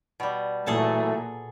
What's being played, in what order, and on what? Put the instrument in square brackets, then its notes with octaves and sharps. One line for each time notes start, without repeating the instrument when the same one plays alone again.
[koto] B2 G3
[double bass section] A#2 [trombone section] E3 F#3 A3 [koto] G#4 A4 A5